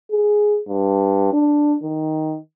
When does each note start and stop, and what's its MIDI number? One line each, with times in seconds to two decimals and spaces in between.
0.12 0.59 68
0.68 1.29 43
1.33 1.75 62
1.83 2.38 51